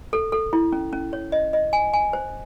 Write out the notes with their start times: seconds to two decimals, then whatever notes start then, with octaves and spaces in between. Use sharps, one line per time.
0.13 A4
0.32 A4
0.53 E4
0.72 C#4
0.93 C#4
1.13 C#5
1.32 D#5
1.53 D#5
1.73 G#5
1.94 G#5
2.13 C5